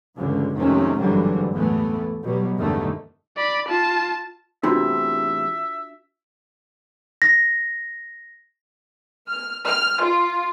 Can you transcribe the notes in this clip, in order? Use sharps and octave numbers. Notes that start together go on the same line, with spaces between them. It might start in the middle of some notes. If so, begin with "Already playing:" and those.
C#2 G2 D3 E3
F1 C3 D#3 G#3 A3 C#4
G#1 G2 D3 E3 F#3 G3
E2 A2 E3 A3 B3
B2 F#3 G3
A1 E2 G2 D3 D#3 A3
D5 B5
F4 A5
E2 A2 C3 D4 F4 F#4 E5
A#6
F6
F6
F4